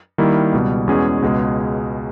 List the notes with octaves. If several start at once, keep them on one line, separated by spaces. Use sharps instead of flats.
D#3 G3 A#3 E4
C#2 B2 G3
E2 B2 G#3 C#4 G#4
C#2 B2 G#3 C#4 G#4